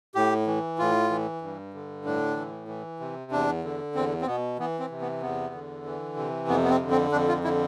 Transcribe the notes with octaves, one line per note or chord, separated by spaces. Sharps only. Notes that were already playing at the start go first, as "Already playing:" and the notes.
A2 G4
E3
A2 F4
E3
G2
D3
A2 D4
E3
E3
C3
E2 D4
D3
E2 C4
C4
B2 B3
E3 B3
C4
C3
B3
E2 B3
D3
E3
C3
F2 B3
B3
C4
D3
C4
F2 D4
F4
D3 E4